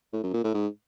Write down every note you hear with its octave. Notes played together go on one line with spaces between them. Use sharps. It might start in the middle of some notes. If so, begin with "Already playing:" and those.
A2
F#2
A#2
A2
G#2